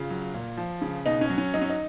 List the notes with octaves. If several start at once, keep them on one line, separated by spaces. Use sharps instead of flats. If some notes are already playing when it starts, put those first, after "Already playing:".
Already playing: C#3 F4
F#3
A#2
F3
C#3
B2 D#4
C#4
F#3
C#4
F#3 D#4
C#4
D#4